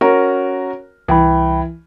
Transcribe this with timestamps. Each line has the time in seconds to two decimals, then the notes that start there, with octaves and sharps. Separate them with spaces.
0.01 C#4 F#4 A#4
1.08 C2 E3 G5 B5